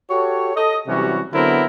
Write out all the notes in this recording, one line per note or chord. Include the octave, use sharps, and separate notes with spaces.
F#4 G4 A4 C#5
A4 D#5
C3 E3 F#3 G3 C#4 F#4
D3 F#3 B3 C4 E4 A#4